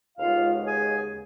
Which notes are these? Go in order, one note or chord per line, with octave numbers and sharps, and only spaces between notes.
D#2 C#3 G#3 B3 F4 F5
G#4 G#5